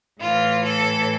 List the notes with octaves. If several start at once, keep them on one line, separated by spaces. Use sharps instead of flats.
A2 E3 F4
A4